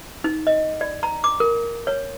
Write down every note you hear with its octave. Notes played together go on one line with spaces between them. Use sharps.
D#4
D#5
D5
A#5
D6
A#4
C#5